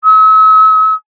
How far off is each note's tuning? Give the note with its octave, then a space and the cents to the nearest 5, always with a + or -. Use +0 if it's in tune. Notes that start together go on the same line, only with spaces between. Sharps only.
E6 -40